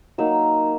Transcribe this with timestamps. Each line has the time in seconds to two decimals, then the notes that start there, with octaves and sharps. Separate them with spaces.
0.18 F#3 A#3 D#4 E6